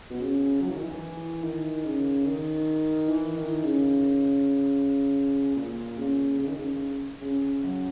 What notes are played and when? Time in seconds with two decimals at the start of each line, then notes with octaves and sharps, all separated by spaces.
0.10 B2
0.20 C#3
0.61 F#3
0.68 E3
0.75 D#3
0.83 E3
1.43 D#3
1.85 C#3
2.26 D#3
3.09 E3
3.36 D#3
3.64 C#3
5.56 A#2
5.98 C#3
6.39 C#3
6.47 D#3
6.56 C#3
7.22 C#3
7.63 F#2